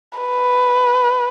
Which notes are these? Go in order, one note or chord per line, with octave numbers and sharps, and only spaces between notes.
B4